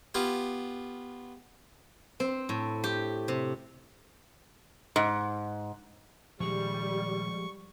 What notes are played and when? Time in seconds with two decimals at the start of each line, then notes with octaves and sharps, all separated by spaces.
0.14 B3 F4 G4 G#5
2.20 C4
2.49 A2
2.84 G4
3.28 C3
4.96 G#2
6.40 A#2 D#3 F3 G3 G#3 G#4 C#6